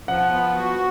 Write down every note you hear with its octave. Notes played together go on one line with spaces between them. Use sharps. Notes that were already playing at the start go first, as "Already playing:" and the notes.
F3 F#5
B3
F#4